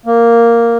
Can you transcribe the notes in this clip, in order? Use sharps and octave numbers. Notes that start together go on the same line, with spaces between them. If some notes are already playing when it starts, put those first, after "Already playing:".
A#3